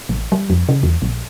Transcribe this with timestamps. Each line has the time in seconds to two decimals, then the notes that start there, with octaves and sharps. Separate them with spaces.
0.09 A1
0.32 G3
0.50 F2
0.69 C#3
0.83 E2
1.02 A#1